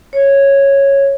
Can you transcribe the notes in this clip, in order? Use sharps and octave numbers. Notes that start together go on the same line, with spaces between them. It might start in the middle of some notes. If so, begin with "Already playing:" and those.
C#5